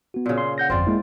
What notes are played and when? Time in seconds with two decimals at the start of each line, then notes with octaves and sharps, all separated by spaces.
0.14 B3 F#4
0.26 A#2 C#3
0.38 C6
0.58 F#5 G6 A#6
0.70 G1 F2 C4 F4 D5
0.87 G#3 A#3 E4